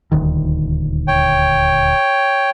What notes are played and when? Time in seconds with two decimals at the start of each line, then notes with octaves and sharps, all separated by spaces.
0.12 D#1 D2 D#3
1.08 C#5 G5